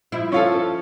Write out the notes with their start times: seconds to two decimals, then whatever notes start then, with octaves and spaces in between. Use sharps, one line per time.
0.12 F3 E4
0.32 C#4 F4 A4